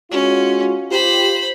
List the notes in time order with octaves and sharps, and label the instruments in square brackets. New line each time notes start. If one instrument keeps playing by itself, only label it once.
[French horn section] G#3 F4 F#4 [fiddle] C#4
[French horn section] F4 G4 [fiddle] C5 B5